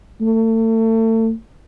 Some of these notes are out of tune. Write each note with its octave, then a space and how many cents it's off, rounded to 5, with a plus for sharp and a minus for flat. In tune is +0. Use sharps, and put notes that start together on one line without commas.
A3 +35